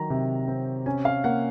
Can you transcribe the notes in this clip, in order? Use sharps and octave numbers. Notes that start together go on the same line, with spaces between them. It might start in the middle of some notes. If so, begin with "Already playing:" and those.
Already playing: D#3 F#3 A#5
C3
C4
C#4 G#5
F5
A#3 F#5